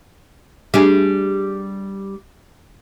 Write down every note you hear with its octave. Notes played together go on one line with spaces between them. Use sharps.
G3 D4 G#4